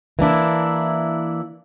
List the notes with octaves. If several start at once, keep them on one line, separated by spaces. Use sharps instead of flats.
E3 A#3 D4 E4